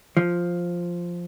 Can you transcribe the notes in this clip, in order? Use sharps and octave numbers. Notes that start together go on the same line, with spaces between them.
F3